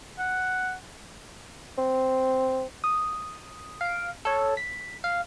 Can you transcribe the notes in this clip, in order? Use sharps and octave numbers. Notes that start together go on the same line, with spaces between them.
F#5
C4
D#6
F5 D7
A4 C#5
B6
F5